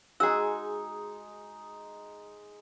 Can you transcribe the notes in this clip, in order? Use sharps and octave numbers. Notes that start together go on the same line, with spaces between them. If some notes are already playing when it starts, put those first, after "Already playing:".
G#3 D#4 F#4 G#4 E6